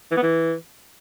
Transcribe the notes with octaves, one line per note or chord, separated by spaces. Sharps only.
E3
B3
E3